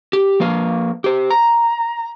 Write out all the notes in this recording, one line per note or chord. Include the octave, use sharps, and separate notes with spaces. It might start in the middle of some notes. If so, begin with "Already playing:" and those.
G4
F3 A#3 B4 F5
G4 C5
A#5